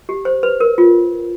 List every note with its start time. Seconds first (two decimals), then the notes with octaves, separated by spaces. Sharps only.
0.09 G4
0.25 C5
0.43 B4
0.60 A#4
0.78 F4